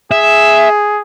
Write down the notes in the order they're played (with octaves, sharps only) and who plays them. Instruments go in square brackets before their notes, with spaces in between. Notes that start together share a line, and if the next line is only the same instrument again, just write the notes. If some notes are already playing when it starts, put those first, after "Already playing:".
[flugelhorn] G#4 [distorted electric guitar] E5